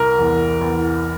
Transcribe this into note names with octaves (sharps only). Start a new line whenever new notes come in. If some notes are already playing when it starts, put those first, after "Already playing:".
Already playing: C2 A#4
E2
E2